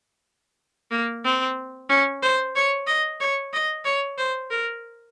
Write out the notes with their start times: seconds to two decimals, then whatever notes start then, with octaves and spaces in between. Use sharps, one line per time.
0.91 A#3
1.25 C4
1.90 C#4
2.23 C5
2.56 C#5
2.87 D#5
3.21 C#5
3.53 D#5
3.85 C#5
4.18 C5
4.51 A#4